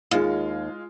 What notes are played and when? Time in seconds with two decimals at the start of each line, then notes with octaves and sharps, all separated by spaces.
0.11 D#2 G#3 F4